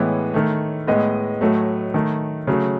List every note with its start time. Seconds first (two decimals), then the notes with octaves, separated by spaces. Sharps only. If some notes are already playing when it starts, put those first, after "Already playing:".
Already playing: A2 E3 G#3 B3 C#5
0.34 D#3 A3
0.87 A2 G#3 B3 D#5
1.41 A2 F#3 A3
1.94 D#3 A3
2.47 C#3 F#3 A3